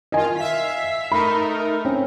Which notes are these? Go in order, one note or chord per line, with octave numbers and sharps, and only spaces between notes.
D#3 F4 D#5 G#5
E5 F5 B6
A3 D#4 A#4 B5
C4 C#4